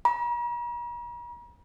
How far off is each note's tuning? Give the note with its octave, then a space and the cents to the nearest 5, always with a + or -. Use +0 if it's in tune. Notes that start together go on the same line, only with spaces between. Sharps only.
A#5 +45